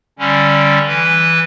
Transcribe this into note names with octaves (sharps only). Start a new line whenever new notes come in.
D3 G3 C#4
E3 B4